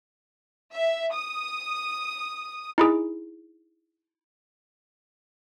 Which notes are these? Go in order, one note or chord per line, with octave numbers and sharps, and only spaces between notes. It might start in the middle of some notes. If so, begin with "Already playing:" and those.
E5
D#6
D#4 E4 G#4